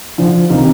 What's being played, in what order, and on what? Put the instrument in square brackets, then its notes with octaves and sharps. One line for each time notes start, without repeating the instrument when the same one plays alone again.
[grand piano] D3 F3
C3 D#3